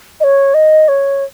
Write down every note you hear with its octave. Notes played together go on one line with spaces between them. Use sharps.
D#5
C#5
D#5
C#5